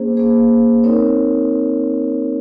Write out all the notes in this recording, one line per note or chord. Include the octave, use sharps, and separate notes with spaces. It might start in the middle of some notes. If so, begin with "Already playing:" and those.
Already playing: A#3 C#4 G#4 C5
A#3 C#4 G#4 C5
C4 D#4 A#4 C#5